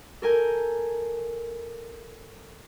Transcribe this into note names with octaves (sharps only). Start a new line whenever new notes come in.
A4 A#4 G#5 G6